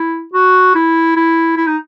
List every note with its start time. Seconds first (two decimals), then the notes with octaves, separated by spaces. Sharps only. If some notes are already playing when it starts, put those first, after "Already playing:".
Already playing: E4
0.34 F#4
0.75 E4
1.16 E4
1.57 E4
1.67 D#4